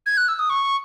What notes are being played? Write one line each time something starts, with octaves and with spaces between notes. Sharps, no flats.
G#6
F#6
E6
D#6
C#6